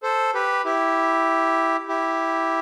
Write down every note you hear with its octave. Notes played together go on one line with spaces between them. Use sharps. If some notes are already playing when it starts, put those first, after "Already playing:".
A4 C5
G4 B4
E4 G4
E4 G4